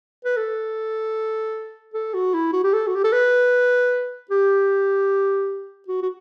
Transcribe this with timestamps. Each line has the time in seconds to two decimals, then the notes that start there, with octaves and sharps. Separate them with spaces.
0.25 B4
0.37 A4
1.94 A4
2.14 F#4
2.34 E4
2.53 F#4
2.64 G4
2.73 A4
2.87 F#4
2.95 G4
3.04 A4
3.13 B4
4.31 G4
5.88 F#4
6.03 F#4